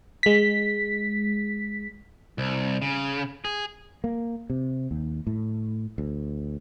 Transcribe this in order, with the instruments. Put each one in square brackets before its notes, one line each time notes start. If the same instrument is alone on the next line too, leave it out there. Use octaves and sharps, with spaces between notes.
[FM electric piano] G#3 B6
[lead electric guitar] C2
C#3
G#4
[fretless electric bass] A#3
C3
D#2
A2
D2